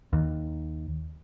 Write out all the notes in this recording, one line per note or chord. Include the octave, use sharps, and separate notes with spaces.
D#2